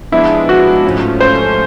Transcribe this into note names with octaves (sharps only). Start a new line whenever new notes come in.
F3 G#3 B3 D4 E4
F3 G#3 B3 D4 F#4
G#2 F3 A3 C#4
G#2 F3 A3 C#4 C5